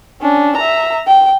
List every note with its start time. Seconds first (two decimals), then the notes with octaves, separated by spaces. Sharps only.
0.21 C#4 D4
0.57 E5 A#5
1.07 G5